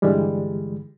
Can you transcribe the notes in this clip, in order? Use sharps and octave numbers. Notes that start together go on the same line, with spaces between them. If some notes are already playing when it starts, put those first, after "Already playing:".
G2 D3 E3 G3 G#3